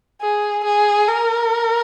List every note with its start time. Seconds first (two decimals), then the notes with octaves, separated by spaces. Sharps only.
0.21 G#4
0.64 G#4
1.07 A#4